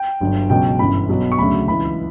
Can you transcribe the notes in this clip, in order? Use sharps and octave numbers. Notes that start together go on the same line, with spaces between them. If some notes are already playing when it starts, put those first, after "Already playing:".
Already playing: G5
G1 G2 F#3
C#2 B2 F#3 G5
G1 F#2 E3 B5
B1 B2 F#3
C#6
D2 C#3 F#3 B5
C#2 C#3 E3 B5